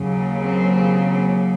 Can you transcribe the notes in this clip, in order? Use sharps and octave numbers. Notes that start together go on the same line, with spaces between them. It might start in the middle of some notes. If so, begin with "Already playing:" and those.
Already playing: D#2 C#3 F#3
C4